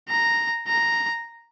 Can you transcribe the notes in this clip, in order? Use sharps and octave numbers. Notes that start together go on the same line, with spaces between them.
A#5
A#5